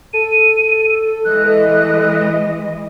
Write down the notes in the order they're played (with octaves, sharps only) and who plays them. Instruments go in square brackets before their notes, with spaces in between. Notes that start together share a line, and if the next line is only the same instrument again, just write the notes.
[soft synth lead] A4 [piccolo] D#7
[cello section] E3 G#3 D#5 [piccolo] F#6